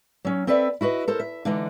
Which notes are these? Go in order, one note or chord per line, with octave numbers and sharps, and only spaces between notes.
F#3 C#4
C4 A4 B4 D5 E5
E4 F#4 B4 D#5
A4 A#4 C5
E5
D3 E3 G#3 D#4